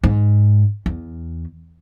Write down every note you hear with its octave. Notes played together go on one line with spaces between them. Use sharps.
G#2
E2